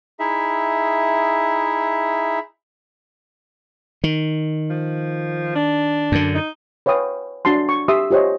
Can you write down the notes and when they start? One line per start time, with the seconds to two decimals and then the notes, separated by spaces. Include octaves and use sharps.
0.19 D#4 E4 G#4 E5
4.04 D#3
4.70 F3
5.55 D4
6.12 F#2 D3
6.35 D#4
6.86 B4 C#5 F5 G5 D#6
7.45 D4 F#4 A5 C6
7.69 C#6
7.88 G4 E5 C6 D#6 E6
8.11 F4 G4 C5 C#5 D#5